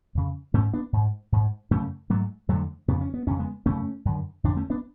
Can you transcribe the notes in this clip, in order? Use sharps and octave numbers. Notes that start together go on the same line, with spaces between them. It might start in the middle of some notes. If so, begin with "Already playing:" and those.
F2 C#3
G#2 A3 C#4
B3 D4
G#2
G#2
F#2 C#3 A3 C#4
G#2 F#3 A3
F2 D3 F#3 A3
F2 C#3 B3
C#4
B3
F2 C#3 C#4
G#3 B3
F#2 C#3 A3 C#4
F#2 D3
F2 D3 D4
A3 C#4
B3 D4